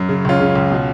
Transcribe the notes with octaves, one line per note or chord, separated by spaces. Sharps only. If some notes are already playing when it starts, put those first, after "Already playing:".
Already playing: F#2
C#3
C#2 C#4 F4
C#3
C#2
B2